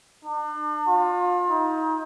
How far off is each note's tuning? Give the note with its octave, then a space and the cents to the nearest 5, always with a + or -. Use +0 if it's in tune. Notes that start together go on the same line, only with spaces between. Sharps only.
D4 +40
F4 +35
D#4 +30